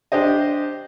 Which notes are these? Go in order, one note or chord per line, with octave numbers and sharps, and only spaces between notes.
D4 G4 C5 D#5